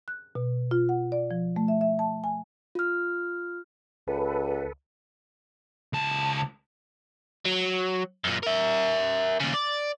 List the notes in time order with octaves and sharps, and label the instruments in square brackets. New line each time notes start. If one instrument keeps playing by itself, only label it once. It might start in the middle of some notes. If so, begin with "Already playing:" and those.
[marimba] F#6
B2
F4
F#5
D5
F3
A3
E5
E5
A5
G#5
[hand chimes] F4 F6
[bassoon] C#2 [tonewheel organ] A4 B4
[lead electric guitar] C#2 A5
[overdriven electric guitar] F#3
F#2 A#2
A#4 E5
D#2 C#3
D5